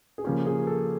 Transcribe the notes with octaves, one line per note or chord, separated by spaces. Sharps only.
G#4
C#3 F3 A#3 C#4 G4
G#4
A4